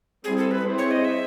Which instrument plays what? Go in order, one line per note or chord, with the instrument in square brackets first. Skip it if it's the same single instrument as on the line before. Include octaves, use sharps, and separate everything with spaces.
[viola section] G3 C4 E4 [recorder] G#4
[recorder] A4
B4
[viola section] C4 E4 G#4 C5
[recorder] C#5
D#5
E5